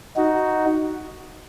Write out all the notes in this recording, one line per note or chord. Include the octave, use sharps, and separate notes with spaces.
D#4 F#4